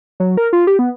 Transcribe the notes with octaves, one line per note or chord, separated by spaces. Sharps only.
F#3
A#4
F4
G4
B3